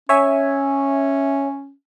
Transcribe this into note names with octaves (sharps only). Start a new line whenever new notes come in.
C#4 C#5 E5 G#5